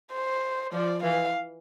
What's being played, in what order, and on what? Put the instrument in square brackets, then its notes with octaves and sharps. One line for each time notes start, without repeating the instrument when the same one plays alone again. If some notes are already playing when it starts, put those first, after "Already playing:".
[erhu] C5
[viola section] F3 [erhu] D5
[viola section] E3 [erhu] F5